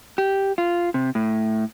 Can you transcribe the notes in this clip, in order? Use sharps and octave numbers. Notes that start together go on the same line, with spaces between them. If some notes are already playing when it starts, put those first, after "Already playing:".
G4
F4
C3
A2